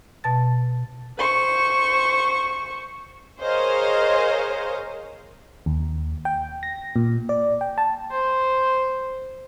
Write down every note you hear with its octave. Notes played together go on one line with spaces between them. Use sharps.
B2 A5 A6
C5 C#6
G#4 A#4 C5 C#5 D#5 F5
D#2
G5
A#6
A#2
D5
G5
A5
C5